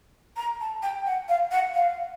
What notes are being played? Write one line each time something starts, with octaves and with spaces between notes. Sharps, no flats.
A#5
A5
G5
F#5
F5
F#5
F5